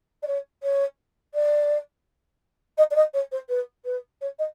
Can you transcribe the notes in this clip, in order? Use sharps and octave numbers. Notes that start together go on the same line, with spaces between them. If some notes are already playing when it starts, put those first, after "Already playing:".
D5
C#5
C#5
D5
D#5
D5
D#5
C#5
C5
B4
B4
C#5
D#5